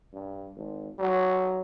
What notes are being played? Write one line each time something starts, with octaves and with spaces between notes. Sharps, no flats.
G2
G#1
F#3